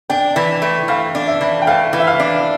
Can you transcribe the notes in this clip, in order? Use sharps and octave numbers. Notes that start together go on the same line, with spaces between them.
D4 G5
E3
A3
E3 F5
D4
E5
E3
G5
A3 F5
E3
E5
F5
D4